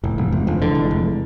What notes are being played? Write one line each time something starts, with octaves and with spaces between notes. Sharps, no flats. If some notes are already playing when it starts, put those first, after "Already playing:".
F1 F2 A2
F1 E2 G#2
F1 E2 G#2
F1 D3 F3
D3 E3 G#3
F1
F1